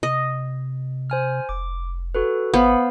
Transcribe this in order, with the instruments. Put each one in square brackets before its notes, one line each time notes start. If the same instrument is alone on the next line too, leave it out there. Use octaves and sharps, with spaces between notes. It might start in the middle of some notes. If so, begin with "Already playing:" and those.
[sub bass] C3 [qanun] D#5
[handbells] C5 G#5 F6
[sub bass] F1 [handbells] D6
[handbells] F#4 A4 B4
[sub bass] G#1 [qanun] B3 [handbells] C5 F5